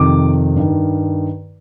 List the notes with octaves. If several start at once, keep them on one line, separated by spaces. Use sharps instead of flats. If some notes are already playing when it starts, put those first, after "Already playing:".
Already playing: F2 C3 D#3 D6
G2 D#3